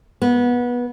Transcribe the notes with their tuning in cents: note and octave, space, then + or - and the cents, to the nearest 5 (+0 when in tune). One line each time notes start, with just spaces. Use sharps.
B3 -20